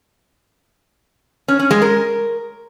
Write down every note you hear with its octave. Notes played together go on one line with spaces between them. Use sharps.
C#4
C#4
G#3
A#4